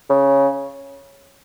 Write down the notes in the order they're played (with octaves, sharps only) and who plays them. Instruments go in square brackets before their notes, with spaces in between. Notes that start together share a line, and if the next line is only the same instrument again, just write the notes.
[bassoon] C#3